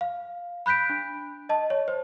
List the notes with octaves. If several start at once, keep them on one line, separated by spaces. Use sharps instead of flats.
F5
B5 F#6 G6 B6 D7
D4
D#5 A5
C#5
C5